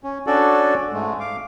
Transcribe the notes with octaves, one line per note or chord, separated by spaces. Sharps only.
C#4
C#4 D4 F#4 A4 D5
G#2 G#3 A3
F5 D6